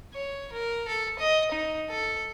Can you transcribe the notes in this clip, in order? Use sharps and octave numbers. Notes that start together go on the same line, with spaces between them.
C#5
A#4
A4
D#5
D#4
A4